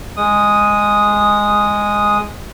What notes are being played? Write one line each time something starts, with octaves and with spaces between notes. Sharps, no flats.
G#3 D#6